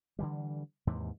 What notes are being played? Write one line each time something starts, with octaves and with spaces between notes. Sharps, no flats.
D3 E3 G3
D#2 G#2 C3 E3